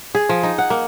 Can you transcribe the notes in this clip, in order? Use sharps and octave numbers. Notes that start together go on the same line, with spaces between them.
G#4
F3
D#4
F#5
A#3